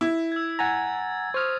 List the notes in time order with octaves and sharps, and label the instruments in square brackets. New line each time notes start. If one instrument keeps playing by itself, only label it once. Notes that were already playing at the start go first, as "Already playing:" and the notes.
[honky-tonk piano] E4
[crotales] E6 G#6
[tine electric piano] F#5 G#5 A#5 [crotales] G#6 A6
[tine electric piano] C5 F6 [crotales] C#6 D#6